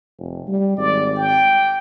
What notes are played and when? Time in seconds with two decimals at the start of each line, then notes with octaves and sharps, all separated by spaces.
0.18 F1
0.47 G3
0.78 G#1 D5
1.16 G5